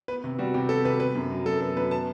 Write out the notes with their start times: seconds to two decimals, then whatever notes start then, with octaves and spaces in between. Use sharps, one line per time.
0.08 B3 B4
0.24 C3
0.39 G3 F#4
0.54 C3 G4
0.69 B3 A4
0.84 C3 B4
1.00 B3 B4
1.15 F#2
1.31 F#3
1.46 F#2 A4
1.61 B3 A4
1.76 F#2 B4
1.91 B3 A5